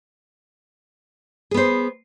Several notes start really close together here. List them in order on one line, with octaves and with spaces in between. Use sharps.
G#4 B3 C5